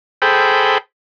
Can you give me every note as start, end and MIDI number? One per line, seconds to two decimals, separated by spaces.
0.22 0.78 68
0.22 0.78 69
0.22 0.78 72
0.22 0.78 79
0.22 0.78 83